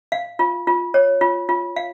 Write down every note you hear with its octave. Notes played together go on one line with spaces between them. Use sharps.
F5
F4
F4
C#5
F4
F4
F5